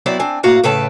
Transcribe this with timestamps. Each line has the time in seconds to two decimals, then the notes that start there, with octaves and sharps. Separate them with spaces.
0.06 F#3 B3 C4 E4 D5
0.19 C4 D4 G#5
0.43 A2 A#3 F#4 F5 F#5 A#5
0.63 A2 C#3 A4 B4 G5 A5